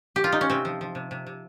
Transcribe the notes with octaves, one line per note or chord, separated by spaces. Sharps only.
G4
F4
D#4
C#4
C3 C4
F3
F3
C3
C3
C3